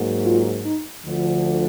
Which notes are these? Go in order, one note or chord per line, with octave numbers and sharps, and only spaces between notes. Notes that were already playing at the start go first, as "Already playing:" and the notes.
Already playing: G#2 F#3 A#3
F4
D#4
D2 D3 F3